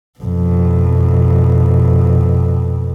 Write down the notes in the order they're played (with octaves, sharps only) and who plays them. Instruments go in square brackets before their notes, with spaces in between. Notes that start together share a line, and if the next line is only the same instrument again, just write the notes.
[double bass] F2 B2